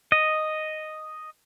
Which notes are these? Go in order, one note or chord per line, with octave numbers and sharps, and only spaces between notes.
D#5